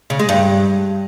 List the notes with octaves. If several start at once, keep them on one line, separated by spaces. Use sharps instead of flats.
C#3
G#3
G2